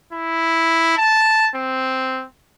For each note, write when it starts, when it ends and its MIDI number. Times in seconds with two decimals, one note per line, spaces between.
0.13 0.97 64
0.98 1.49 81
1.55 2.24 60